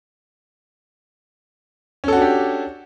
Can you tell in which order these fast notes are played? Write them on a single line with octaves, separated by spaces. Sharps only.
C#4 A4 F#4 D4 G4